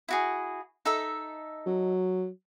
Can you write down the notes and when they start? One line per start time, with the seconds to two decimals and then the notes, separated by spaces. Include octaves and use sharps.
0.09 E4 F#4 G#4
0.85 D#4 A4 E5
1.66 F#3